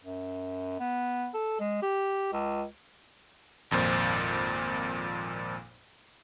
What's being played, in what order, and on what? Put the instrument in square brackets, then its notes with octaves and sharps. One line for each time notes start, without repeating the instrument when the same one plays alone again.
[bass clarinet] F#2
B3
A4
G#3
G4
C#2
[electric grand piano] G#1 F2 A#2 C5